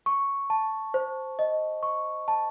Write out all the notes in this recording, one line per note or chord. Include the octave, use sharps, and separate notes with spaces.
C#6
A5
C5
D#5
C#6
A5